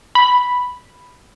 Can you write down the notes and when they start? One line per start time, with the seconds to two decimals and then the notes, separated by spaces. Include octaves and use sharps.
0.15 B5